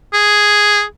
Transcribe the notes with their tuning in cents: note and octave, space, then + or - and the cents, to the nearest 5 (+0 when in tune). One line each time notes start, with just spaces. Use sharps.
G#4 +0